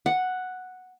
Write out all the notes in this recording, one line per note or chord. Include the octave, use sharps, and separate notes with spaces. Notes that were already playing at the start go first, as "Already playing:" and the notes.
F#5